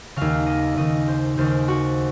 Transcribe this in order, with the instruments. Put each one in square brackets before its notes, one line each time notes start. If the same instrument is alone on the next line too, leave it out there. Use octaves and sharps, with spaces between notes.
[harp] D#2 C#3 F5
D#5
D#2 C#3 D#5
C5
D#2 C#3 C5
F#4